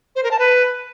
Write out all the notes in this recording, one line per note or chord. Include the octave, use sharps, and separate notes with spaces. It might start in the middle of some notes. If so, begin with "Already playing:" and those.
C5
A#4
A5
B4